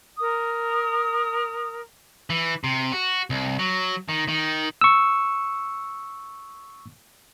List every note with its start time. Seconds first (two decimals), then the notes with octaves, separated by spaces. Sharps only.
0.16 A#4 D#6
2.30 E3
2.64 C3
2.92 F#4
3.30 C2
3.59 F#3
4.09 D#3
4.28 D#3
4.81 C#6 E6